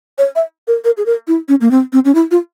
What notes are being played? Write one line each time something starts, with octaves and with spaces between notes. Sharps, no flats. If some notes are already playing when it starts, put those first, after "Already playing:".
C#5
E5
A#4
A#4
G#4
A#4
E4
C#4
A#3
C4
C4
C#4
E4
F4